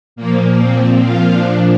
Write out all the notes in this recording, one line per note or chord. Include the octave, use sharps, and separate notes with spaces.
A#2 F3 A#3
C4
F4
D4